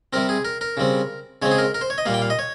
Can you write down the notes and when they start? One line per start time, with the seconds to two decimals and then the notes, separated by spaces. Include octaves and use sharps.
0.13 C3 G3 C4 A#4
0.29 G#4
0.45 A#4
0.61 A#4
0.77 C#3 G3 C4
1.42 C#3 G#3 C4 C#5
1.51 G#4
1.58 A#4
1.74 A#4
1.81 C5
1.90 C#5
1.98 D#5
2.06 A#2 G3 A#3 F5
2.14 G5
2.22 F5
2.30 D#5
2.39 C#5